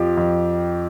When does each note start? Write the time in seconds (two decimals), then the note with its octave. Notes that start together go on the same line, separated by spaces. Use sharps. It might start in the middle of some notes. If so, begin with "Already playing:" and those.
Already playing: F2 F3 G4
0.17 F2